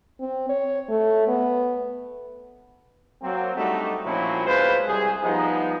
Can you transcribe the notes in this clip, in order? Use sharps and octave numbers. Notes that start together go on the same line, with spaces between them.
C4
C#5
A3
B3
F#3 A#3 C4
G3 A3 D4 D#4 F#4
A#2 F3 F#3 C4 C#4 E4
B1 G#3 F4 B4 C5
C2 G#4
F3 G3 B3 D#4